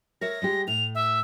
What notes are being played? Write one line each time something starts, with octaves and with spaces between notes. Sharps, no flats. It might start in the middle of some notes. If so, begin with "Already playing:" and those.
A#4 C#5 E5 A#6
G3 G#3 G4
A2 F7
E5